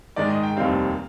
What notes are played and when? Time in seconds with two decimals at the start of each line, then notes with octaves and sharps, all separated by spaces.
0.16 G#2 D#3 G#3 D5
0.30 D#5
0.43 G5
0.57 F1 D#2 D#3 G3 C4 F5